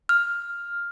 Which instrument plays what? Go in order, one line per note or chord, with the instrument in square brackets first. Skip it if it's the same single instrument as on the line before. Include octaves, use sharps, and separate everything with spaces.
[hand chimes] F6